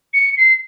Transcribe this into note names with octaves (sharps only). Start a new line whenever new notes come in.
C#7
C7